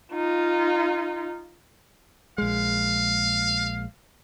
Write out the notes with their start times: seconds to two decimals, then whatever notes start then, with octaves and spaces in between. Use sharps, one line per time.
0.13 D#4 F4
2.38 A#1 G#3 F5